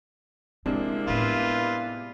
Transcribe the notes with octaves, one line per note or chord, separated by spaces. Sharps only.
C3 G3 G#3 A#3 C4 D4 E4
A2 B3 F4 B4